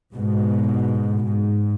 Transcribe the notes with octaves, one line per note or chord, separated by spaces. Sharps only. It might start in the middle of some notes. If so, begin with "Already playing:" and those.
G#2 B2
G#2